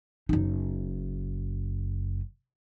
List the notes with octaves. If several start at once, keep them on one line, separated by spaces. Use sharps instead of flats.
F#1 D#4